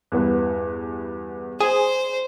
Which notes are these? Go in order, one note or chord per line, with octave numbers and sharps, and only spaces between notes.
E2 G2 B3
G#4 C5